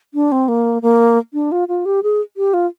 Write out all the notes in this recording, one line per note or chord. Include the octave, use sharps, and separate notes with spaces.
D4
C4
A#3
A#3
D4
F4
F4
G4
G#4
G4
F4